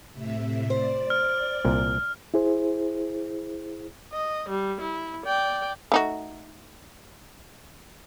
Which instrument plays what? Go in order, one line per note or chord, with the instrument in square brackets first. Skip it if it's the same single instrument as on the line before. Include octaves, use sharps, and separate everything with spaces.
[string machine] A2 C3 E5
[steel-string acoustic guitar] C5 [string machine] D5
[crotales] F6
[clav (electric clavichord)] C2 A#2
[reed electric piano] E4 G#4 C5
[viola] D#5
G3
E4
D5 G5
[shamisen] A3 D#4 F#4